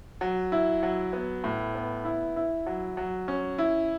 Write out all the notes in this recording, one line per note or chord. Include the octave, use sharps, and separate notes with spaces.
F#3
E4
F#3
B3
A2
B3
E4
E4
F#3
F#3
C#4
E4